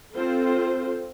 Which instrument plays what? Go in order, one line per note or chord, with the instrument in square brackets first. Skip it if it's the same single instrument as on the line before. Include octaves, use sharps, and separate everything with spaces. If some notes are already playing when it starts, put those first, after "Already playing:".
[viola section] C4 F4 A4 C5